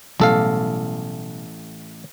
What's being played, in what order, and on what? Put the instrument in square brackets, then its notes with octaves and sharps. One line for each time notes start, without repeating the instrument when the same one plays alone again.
[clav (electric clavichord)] A1 A4 F5 [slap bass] B2 F#3 G3